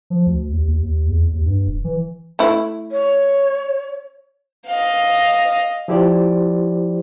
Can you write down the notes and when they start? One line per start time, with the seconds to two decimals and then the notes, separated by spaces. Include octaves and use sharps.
0.10 F3
0.26 D2
0.52 D#2
0.68 D#2
0.82 D#2
1.08 E2
1.33 D#2
1.46 G2
1.67 D#1
1.84 E3
2.39 A3 E4
2.92 C#5
4.67 D#5 F5
5.88 F3 E4 G4 C5 D5